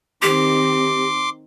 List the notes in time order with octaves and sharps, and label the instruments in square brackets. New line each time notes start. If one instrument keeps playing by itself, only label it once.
[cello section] D#3 C4 [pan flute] G4 [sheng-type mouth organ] C6 D6